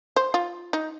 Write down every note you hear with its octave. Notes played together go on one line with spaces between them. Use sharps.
C5
F4
D#4